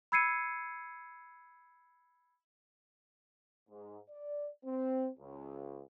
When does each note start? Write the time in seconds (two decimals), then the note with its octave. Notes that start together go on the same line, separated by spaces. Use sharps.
0.12 B5 E6 G#6 C7 C#7 D#7
3.69 G#2
4.09 D5
4.65 C4
5.18 C#2